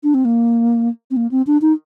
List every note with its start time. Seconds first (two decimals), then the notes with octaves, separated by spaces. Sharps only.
0.04 D4
0.14 C4
0.25 A#3
1.11 C4
1.17 A#3
1.31 C4
1.47 D4
1.62 D#4